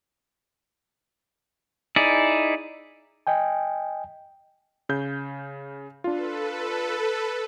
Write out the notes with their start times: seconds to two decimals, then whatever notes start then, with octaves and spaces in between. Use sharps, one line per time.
1.96 D#4 E4 G#4 D5
3.27 D#5 G5 G#5
4.89 C#3 G6
6.04 D4 F4 A4 B4